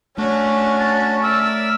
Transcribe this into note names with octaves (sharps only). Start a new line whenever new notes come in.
A3 C#4 D4 F#4
A5
A#4 D5 E5 E6